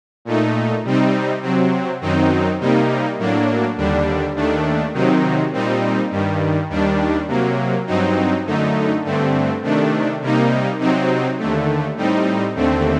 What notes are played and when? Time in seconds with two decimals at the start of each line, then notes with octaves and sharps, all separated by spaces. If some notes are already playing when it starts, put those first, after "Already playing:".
0.25 A#2 A3 D#4
0.85 C3 G3 C4 D#4
1.42 C3 F#3 C4
2.01 F#2 D#3 F#3 C4 D#4
2.60 C3 G3 A#3 D#4
3.18 A2 F#3 A#3 D4
3.77 D#2 D3 G3 D4
4.35 D#2 D#3 A3 D4
4.94 C3 D#3 F#3 C4 D#4
5.52 A#2 G3 C4 D#4
6.11 G2 D#3 G3
6.69 D#2 D#3 G3 D4
7.28 C3 F#3 A#3
7.87 G2 F#3 C4 D#4
8.45 F#2 D3 A3 D#4
9.04 G2 D3 A3 C4
9.62 C3 D#3 A3 D4
10.21 C3 G3 A#3 D#4
10.79 C3 F#3 C4 D#4
11.38 D#2 D3 A3
11.96 A2 G3 C4 D#4
12.55 D#2 D3 A3 C4